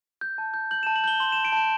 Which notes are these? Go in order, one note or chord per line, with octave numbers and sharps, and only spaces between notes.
G6
A5
G6
G6 F#7
A5 E7
F#7
G6 G7
C6 F#7
E7
A5
D7
A5 E7